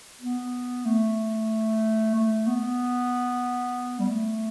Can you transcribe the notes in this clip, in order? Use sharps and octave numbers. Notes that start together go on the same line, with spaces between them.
B3
A3
A3
B3
G3
A3